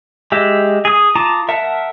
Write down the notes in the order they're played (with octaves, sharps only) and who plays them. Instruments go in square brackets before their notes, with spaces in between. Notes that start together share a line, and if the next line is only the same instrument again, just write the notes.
[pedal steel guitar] G#3 G4 E5
G#4 D#6
F4 A5 A#5 D6 D#6
A#4 E5 F#5 A5